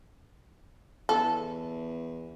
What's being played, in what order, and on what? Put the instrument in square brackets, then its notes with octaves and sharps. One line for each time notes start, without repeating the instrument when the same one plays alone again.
[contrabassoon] E2 [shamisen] A4